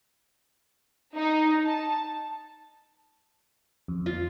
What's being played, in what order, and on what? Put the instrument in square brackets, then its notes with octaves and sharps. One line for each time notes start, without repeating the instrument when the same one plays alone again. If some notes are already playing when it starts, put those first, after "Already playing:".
[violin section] D#4
A5
[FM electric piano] F2
[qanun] F4